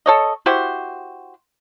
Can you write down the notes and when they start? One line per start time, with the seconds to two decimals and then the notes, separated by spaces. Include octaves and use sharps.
0.06 A4 C#5 D#5
0.46 E4 F#4 G4 C5